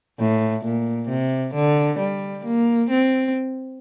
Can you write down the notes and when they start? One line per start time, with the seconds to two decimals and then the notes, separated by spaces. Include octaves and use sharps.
0.19 A2
0.64 A#2
1.09 C3
1.54 D3
1.99 G3
2.45 A#3
2.90 C4